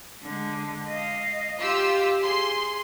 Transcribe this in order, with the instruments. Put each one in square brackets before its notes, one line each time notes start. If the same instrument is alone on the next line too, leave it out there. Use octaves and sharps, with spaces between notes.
[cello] D3 G#3
D#5 F5
[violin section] F4 E6 [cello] G4
[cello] G#4 [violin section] C6